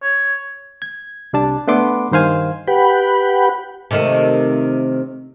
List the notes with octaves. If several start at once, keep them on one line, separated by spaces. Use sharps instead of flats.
C#5
G#6
C2 G3 D4 A5
A3 B3 D4 C6 D6
G2 D#3 C5 F5 G#5
G4 B4 F#5 G5 B5
C3 D#3 A3